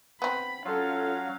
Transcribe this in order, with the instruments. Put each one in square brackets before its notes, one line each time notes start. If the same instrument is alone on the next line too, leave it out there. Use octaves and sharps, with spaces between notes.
[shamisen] B3 C4 [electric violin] B5
[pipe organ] F#3 [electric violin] C#4 F5 [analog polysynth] F4 A4